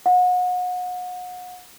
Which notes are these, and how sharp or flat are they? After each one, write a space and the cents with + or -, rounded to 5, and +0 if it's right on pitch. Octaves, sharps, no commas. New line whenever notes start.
F#5 -35